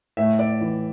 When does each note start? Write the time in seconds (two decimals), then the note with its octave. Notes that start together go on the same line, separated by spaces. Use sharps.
0.17 A2 E5
0.39 D5
0.61 E3